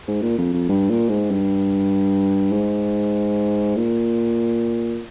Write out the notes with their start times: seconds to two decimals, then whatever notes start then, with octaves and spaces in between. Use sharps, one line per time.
0.08 G#2
0.22 A#2
0.38 F2
0.53 F2
0.69 G2
0.90 A#2
1.09 G#2
1.31 G2
2.52 G#2
3.76 A#2